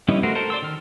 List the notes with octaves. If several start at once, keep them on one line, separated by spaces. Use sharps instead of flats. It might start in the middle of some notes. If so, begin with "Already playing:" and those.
G3 B3 C#4 D#4 E4
A3 F#4 A#4 C5
A4 A#4 C5
D5 C6 E6
D#3 F6